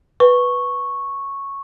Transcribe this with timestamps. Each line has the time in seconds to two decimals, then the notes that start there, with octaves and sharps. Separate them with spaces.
0.20 B4 C#6